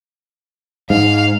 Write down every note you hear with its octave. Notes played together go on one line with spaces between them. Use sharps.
G#2 F5